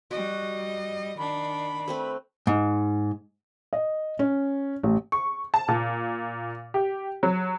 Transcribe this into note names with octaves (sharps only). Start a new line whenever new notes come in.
G3 F#4 D#5
D#3 D4 B5
A3 C4 B4
G#2
D#5
C#4
A1
C#6
A5
A#2
G4
F#3